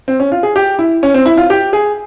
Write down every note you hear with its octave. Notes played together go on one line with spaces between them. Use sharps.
C4
C#4
F4
G#4
G4
E4
C#4
C4
E4
F4
G4
G#4